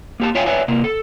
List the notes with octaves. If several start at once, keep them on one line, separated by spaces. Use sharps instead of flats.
A#3 G4 A5
F4 C#5 E5 F5 G5 G#5
B4 C#5 D5 E5 G#5
C3 A#3
A4